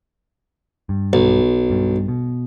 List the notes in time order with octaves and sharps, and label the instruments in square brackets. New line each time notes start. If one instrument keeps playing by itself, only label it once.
[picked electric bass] G2
[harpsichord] B1
[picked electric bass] G2
B2